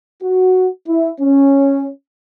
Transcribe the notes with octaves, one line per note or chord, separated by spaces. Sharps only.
F#4
E4
C#4